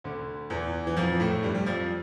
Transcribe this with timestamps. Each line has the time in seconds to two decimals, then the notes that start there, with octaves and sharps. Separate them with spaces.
0.04 D2 D3
0.50 E2 E3
0.87 E3
0.97 F2 F3
1.20 A2 A3
1.43 G2 G3
1.55 G3
1.66 F2 F3
1.80 F3